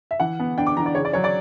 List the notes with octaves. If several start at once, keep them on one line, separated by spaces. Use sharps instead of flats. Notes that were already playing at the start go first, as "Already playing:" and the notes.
E5
E3 F#5
B3
D4 G5
D6
E3 A#5
D5
C#3 C#5
D5
F#3 C#5
D5